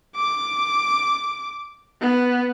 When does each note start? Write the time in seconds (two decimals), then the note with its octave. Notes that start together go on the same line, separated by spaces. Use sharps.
0.16 D6
2.01 B3